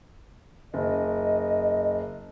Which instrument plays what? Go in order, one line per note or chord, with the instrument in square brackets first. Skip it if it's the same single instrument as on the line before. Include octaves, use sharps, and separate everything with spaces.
[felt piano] F#1 [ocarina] D#5